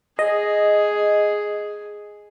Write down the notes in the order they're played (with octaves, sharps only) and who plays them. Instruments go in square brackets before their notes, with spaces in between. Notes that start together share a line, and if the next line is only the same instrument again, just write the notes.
[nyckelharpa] G#4 [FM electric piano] D#5